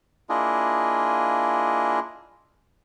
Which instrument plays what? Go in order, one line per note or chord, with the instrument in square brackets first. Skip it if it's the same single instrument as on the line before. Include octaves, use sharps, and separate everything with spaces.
[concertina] A#3 D4 E4 F4 G#4 D#5